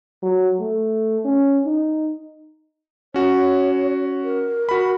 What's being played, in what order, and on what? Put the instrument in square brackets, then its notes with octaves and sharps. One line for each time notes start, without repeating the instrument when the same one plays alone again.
[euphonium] F#3
A3
C#4
D#4
[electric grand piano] C#4 F#4 [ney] C#5
[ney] A#4
[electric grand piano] F#4 B5